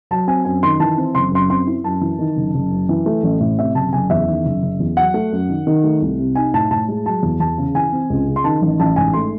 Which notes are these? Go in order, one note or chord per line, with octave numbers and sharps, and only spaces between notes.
F#3 A5
C4 G#5
F#2 G#5
D#3 C6
E3 A5
C4
F#1 C6
F#2 C6
C4 C6
E4
F#2 A5
E3
D#3
F#1
F#1
F#2
E3
A3
A1
A2
C3 E5
F#1 A5
F#1 G#5
E2 E5
D#3
F#1
F#1
E2
F#3 F#5
A3
F#2
D#3
D#3
A3
C2
C3
D#4 G#5
A2 A5
A2 A5
G#3
F#3 A5
E2
E2 A5
C#3
E3 G#5
C4
C#2
C#3
C6
D#3 A5
A1
A1 A5
G#2 G#5
A3 C6